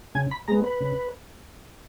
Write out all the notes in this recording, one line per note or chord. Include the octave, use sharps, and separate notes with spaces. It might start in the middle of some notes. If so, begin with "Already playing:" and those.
C#3 G#5
B5
G#3 B3 A#5
B4
C#3